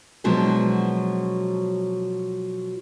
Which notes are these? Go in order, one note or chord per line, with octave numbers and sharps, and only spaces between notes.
B2 F3 F#3 G#3 D4